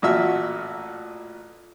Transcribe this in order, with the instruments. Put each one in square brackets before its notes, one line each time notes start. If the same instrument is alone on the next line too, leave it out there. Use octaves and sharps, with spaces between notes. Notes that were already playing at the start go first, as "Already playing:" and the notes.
[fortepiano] A1 A#2 F#4 E5 E6 F6